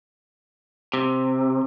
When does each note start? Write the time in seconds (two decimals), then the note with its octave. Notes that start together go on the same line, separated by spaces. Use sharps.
0.94 C3